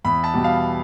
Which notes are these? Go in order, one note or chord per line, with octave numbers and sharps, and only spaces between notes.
E2 B5
A5
B2 G3
F5